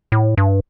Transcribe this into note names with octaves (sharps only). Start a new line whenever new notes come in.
A2
G2